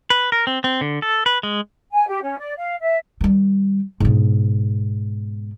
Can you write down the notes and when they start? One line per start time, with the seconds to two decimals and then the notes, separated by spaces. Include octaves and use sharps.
0.10 B4
0.32 A#4
0.47 C4
0.64 C4
0.81 D3
1.02 A4
1.26 B4
1.43 G#3
1.92 G#5
2.08 G4
2.23 C#4
2.38 D5
2.56 F5
2.82 E5
3.21 D#3 G3
4.00 G#2 B2